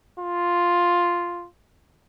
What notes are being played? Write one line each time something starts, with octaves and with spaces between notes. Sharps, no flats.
F4